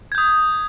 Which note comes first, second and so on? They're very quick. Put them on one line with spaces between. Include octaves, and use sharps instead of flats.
G#6 G6 D#6